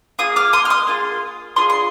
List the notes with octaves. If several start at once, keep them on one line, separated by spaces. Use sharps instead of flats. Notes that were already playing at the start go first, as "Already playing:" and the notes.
A#3 F4 G#4 D#6
D6 F6
C6 D#6
F6
C6 D#6
A#3 F4 G#4
D4 F4 G#4 C6 D#6
C6